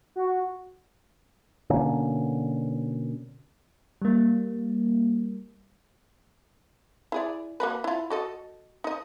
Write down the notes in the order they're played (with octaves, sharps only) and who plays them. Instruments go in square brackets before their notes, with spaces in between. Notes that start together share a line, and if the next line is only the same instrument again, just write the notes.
[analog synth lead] F#4
[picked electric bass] B2 D3 A#3 C#4
[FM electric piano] G3 A#3
[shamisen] E4 G#4 D5
A#3 F#4 B4
E4 F4
F#4 A4 D#5
D#4 D#5